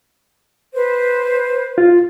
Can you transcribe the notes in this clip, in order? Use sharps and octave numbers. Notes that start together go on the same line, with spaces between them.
B4 C5
F4